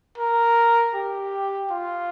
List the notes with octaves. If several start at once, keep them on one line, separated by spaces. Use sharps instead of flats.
A#4
G4
F4